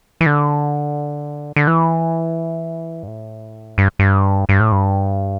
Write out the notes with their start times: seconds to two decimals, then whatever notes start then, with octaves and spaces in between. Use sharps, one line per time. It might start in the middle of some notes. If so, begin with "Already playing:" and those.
0.21 E3
0.26 D3
1.56 D3
1.67 E3
3.03 G2
3.08 A2
3.78 G2
3.99 G2
4.49 G2
4.60 A2
4.72 G2